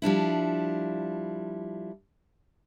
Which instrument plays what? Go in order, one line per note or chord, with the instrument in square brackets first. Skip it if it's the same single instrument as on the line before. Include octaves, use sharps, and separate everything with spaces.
[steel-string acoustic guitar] F3 G3 D4 E4